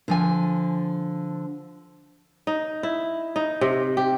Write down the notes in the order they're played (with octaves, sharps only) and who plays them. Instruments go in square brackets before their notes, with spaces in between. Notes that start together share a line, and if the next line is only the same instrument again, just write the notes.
[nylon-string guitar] D3 F3 G#5
[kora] D#4
E4
D#4
C3
G4